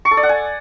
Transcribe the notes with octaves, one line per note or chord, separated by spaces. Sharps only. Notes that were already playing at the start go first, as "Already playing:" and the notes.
C#6
A4
D5
F#5
G#5